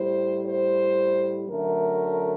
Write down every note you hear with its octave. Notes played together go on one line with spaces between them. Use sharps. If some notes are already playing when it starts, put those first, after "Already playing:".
Already playing: A2 G3 C5
C5
F#2 D3 F#3 A3 A#4